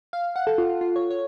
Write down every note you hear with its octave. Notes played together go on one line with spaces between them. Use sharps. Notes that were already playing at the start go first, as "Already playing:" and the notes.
F5
F#5
A4
F4
F4
F4
C#5
C#5